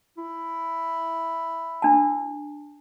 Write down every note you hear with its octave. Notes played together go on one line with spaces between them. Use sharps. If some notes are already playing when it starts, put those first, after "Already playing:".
E4
D4 A5